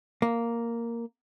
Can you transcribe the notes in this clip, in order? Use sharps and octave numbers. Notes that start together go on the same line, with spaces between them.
A#3